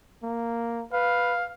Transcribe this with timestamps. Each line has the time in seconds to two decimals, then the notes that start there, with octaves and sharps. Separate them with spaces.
0.23 A#3
0.93 B4 F5